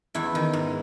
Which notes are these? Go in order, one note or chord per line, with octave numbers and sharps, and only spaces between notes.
E2 E4
D#3
G#2